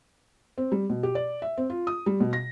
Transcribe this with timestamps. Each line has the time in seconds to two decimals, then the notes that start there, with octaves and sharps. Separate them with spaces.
0.58 C4
0.72 G3
0.90 B2
1.03 G4
1.15 D5
1.42 E5
1.58 C4
1.70 F4
1.87 D#6
2.06 G3
2.20 B2
2.33 A#6